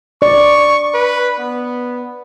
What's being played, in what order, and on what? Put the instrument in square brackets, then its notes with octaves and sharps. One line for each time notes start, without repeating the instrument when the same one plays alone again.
[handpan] D5 [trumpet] C#6
[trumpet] B4
B3